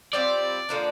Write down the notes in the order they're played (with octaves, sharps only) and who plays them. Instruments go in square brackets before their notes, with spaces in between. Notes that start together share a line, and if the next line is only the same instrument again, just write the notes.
[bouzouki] G3 C4 F4 [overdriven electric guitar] D5
[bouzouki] D3 F3 A#3 D4